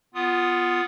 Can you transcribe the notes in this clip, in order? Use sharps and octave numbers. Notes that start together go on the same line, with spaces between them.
B3 F4 D#6